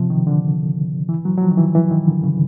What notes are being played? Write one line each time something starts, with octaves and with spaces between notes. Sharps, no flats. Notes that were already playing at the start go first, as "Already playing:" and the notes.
Already playing: C3 F3
D#3
D3
E3
F#3
F#3
F3
D#3
E3
E3
D#3
D3
C#3